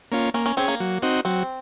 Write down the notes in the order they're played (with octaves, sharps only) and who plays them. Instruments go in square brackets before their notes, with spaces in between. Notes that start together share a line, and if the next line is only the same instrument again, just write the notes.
[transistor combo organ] A#3 C#4 F4
[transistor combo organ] A#3 [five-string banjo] C#4
[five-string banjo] C#4
[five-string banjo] C4 [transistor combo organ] C#4 G#4
[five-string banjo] A#3
[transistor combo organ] F#3
C4 D#4 F#4
[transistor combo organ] F#3 [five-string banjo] C4